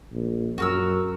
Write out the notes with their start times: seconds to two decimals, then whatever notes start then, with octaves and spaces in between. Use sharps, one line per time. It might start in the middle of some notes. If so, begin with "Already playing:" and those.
0.12 A#1
0.58 F#2 F#4 A#4 E6